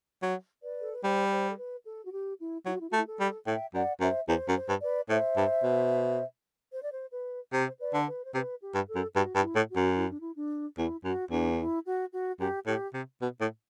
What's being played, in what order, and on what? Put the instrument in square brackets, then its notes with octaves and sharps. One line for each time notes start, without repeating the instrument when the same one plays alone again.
[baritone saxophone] F#3
[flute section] B4 D5
A4
B4
[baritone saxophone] G3 [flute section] C5
[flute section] C5
A4
B4
A4
F#4
G4
E4
[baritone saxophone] F#3 [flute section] E4
[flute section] F#4
E4
[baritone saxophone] A3 [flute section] F#4
[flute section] E4
A4
[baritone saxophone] G3
[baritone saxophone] A2 [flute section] E5 G5
[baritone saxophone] F#2 [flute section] D5 F#5
[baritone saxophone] F#2 [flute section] C5 E5
[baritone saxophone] E2 [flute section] C5
[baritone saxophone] F#2
[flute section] C5
[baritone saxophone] G2
[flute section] B4 D5
[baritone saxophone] A2 [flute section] C5 E5
[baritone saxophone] G2
B2
[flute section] C5
D5
C5
B4
[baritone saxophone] C3 [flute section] C5
[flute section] B4 D5
[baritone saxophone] D3
[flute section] B4
C5
[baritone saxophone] C3 [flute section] B4
[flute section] G4
[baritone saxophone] G2
[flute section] A4
[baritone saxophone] F#2
[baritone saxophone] G2 [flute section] F#4
[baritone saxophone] G2
[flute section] E4
[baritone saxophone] A2
[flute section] F#4
[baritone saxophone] F#2
[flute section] E4
D4
E4
D4
[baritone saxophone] E2 [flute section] E4
[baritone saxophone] F#2 [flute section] F#4
[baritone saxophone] E2 [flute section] D4
[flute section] E4
F#4
F#4
[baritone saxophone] F#2 [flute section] G4
[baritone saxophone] A2 [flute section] G4
[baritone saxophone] C3
B2
A2